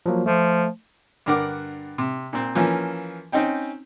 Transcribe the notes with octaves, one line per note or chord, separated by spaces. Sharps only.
F3 F#3 A#3
F3 A3
G2 D3 A#4 F#5 D6
C3
A#2 C4
E3 F3 A#3 C#4
C4 C#4 D#4 G5